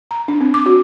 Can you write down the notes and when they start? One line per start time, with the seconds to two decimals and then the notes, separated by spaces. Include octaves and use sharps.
0.11 A#5
0.28 D4
0.41 C4
0.54 D6
0.66 F#4